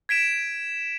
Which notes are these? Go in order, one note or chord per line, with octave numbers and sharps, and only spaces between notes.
G#6 B6 D7 E7